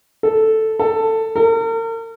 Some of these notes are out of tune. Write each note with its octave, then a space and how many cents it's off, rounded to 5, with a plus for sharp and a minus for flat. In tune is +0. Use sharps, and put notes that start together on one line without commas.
A4 +0
A4 +15
A#4 -40